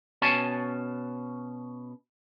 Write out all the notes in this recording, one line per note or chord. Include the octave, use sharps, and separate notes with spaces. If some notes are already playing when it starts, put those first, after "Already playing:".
B2 C#4 G#5 A5